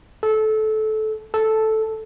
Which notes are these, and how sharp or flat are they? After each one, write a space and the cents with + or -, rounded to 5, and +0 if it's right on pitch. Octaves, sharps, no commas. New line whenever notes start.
A4 -20
A4 -5